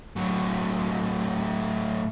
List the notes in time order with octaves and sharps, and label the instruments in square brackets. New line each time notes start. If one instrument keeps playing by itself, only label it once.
[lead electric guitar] A2 F#3